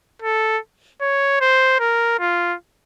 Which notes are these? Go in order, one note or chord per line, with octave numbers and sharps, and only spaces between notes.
A4
C#5
C5
A#4
F4